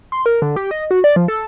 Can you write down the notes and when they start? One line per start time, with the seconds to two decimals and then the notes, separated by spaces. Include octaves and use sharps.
0.12 C6
0.26 A#4
0.42 D3
0.56 G4
0.71 D#5
0.91 F#4
1.04 D5
1.16 F3
1.28 A4